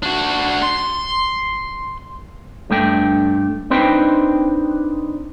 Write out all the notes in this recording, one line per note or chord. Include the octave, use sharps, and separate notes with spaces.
D4 F#4
C6
G2 A3 D4 G5
C4 D4 D#4 B4 C5 G5